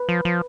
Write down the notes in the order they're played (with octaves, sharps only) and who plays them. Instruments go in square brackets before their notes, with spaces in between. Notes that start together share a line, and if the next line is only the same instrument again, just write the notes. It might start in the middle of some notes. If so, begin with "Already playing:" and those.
Already playing: [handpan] B4
[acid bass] F3
F3